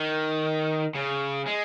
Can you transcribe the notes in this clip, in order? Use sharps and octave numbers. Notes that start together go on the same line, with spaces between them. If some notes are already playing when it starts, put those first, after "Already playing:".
Already playing: D#3
C#3
G#3